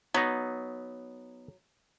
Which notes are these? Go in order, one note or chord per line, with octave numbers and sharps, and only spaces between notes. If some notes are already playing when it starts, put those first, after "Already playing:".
F#3 B3 D#4